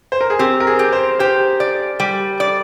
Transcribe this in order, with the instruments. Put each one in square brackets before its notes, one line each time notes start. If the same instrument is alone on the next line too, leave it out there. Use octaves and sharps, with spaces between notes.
[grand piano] C5
A#4
G#4
[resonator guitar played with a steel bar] C4 [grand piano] G4
[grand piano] A#4
G#4
[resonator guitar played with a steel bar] G4
[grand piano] C5
[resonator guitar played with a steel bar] G4 [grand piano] C5
[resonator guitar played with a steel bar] D5
G3
D5